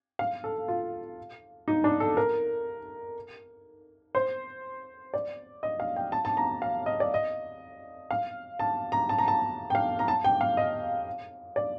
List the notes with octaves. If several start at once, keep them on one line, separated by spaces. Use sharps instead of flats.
F5
A4
F4
D#4
D4
A4
A#4
C5
D5
D#5
F5
G5
A5
A5
A#5
F5
D#5
D5
D#5
F5
A5
A#5
A5
A#5
A5
G5
F5
A#5
A5
G5
F5
D#5
D5